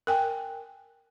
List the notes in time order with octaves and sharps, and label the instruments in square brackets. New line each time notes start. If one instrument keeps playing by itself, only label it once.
[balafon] A#4 G5 G#5